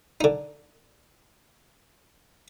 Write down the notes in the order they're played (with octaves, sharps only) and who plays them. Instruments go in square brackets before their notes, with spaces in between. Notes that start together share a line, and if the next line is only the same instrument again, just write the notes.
[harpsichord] D3 D#4